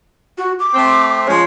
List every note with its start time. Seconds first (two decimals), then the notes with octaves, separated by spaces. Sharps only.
0.38 F#4
0.59 D6
0.74 A3 C4
1.27 F3 G#3 C#4 C#5